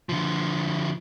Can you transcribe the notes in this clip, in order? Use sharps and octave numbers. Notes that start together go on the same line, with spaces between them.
D3 F3